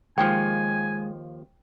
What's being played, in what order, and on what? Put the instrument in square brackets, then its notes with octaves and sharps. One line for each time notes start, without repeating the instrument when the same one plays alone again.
[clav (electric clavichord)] D#2 D#3 F3 [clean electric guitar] G#3 [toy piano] G5 [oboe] G#5